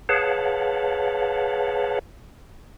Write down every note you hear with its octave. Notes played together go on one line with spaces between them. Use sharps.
G#4 B4 C#5 F5 F#5 A5